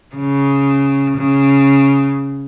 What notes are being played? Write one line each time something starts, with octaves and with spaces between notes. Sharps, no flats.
C#3
C#3